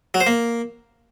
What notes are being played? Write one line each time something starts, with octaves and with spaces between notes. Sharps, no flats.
F#3
C5
A#3